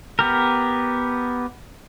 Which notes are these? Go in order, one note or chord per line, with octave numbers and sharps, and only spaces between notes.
B3 G4 A#4